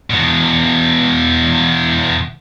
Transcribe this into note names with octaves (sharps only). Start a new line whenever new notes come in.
E2 B2